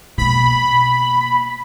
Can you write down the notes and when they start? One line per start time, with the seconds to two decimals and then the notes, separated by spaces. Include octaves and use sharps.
0.18 B2 A#3 B5